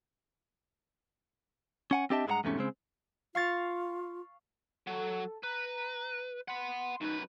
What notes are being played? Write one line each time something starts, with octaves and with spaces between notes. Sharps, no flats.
C#4 F#5 G#5
C4 D4 G4 D#5 E5 A5
G2 G#3 E4 F#4 F#5 A#5
E2 G#2 C3 A3 C#4
C#3 G#3 C4
F4 F5 C#6 A6
F#3 A4
B4 A#5
F#5 B5 C6
F#2 D#4 B4